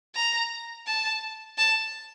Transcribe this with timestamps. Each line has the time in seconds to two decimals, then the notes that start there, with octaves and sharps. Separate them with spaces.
0.15 A#5
0.87 A5
1.58 A5